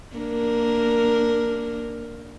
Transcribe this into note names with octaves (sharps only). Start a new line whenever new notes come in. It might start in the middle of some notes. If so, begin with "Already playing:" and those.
A#3 D4 A#4